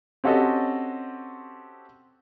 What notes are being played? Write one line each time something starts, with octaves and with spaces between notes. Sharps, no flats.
C4 C#4 F#4 G4 A4 D#5